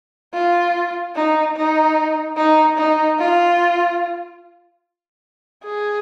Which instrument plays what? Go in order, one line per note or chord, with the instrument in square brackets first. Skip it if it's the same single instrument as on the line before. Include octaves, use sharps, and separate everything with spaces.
[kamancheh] F4
D#4
D#4
D#4
D#4
F4
G#4